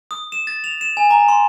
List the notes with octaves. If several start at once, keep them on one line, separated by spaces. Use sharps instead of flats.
D#6
E7
A6
F7
E7
G#5
A#5
C6